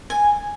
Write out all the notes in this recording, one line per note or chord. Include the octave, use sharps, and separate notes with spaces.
G#5